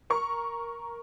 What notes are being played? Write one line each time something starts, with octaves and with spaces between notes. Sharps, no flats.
A#4 C#6